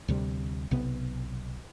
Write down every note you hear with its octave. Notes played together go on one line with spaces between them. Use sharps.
D2 C3 G3
B1 C3 B3